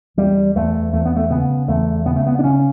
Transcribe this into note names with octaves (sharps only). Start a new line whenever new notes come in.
E2 G3
E2 A3
E2 A3
B3
A3
C#3 B3
E2 A3
C#3 B3
A3
B3
D4
C#3 C#4